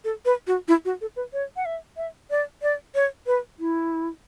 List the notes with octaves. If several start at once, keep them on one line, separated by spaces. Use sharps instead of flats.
A4
B4
F#4
E4
F#4
A4
B4
C#5
F#5
E5
E5
D5
D5
C#5
B4
E4